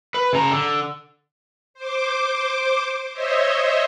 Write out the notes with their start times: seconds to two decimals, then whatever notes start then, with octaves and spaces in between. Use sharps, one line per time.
0.14 B4
0.33 C#3 A#5
0.51 D3
1.74 C5 D6
3.13 C5 C#5 D#5 E5